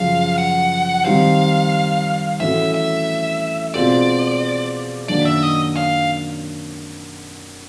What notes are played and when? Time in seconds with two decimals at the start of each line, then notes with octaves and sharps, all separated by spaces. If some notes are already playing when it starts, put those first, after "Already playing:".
Already playing: F#2 C#3 F3 G#3 F5
0.38 F#5
1.05 D#3 G3 C4 F5
2.40 A2 E3 A3 C#4 F#4 E5
2.74 E5
3.74 B2 G#3 C4 F4 D5
5.08 F#2 D#3 F#3 A#3 D4 D5
5.25 E5
5.43 D#5
5.76 F5